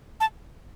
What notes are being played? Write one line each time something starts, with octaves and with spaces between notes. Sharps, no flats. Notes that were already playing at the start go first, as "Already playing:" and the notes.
A5